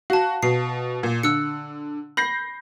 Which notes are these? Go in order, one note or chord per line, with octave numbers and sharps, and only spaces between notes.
F#4 F5 A5
B2 C7
A#2
D3 E6 F#6 C#7
B5 G6 A#6 C7